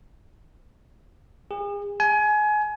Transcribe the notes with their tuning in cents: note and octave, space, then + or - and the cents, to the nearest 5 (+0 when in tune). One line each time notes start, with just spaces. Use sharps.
G#4 -40
G#5 +25